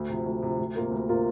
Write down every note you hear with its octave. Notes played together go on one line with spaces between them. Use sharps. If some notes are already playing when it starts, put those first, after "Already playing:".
Already playing: D2
C3 F3
D2
C3 F3
D2
C3 A#3 F4 A#4
D2
C3 A#3 F4 A#4